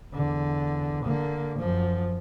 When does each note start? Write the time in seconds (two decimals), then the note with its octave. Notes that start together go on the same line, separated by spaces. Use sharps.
0.14 E2 D3
1.04 D3 A#3
1.59 F#2 F3